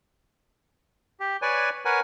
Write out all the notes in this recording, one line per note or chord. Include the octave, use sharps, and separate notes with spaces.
G4
B4 C#5 D5 G#5
A#4 B4 C#5 F#5 G#5